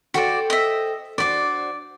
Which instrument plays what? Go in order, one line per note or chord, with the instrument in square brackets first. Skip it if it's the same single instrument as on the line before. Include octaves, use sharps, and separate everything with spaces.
[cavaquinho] F#4 D5 [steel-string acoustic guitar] A4 C5 G5
[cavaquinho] D#5 E5
[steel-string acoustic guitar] D4 F#4 C5 [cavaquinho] D5 D6